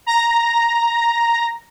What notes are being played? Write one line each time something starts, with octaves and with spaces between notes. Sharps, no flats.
A#5 A#6